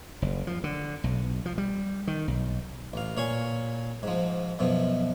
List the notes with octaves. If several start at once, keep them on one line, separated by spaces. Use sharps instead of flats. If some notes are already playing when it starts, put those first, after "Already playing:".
F#1
F3
D3
B1
F3
G3
D#3
B1
A1 F5
A#2 C#5 F5 G#5
G#2 F3
F#2 B2 F3